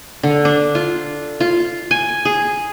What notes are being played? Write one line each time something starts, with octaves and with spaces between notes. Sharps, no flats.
D3
D4
F4
F4
G#5
G#4